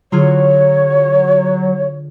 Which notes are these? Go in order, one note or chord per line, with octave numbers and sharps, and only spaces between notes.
D3 F#3 F4 G#4 C#5